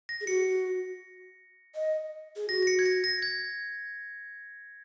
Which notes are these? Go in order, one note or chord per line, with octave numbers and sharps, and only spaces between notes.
A#6
G#4
F#4 C#7
D#5
G#4
F#4 A#6
A#6
C#7
G#6
A#6
A#6
G#6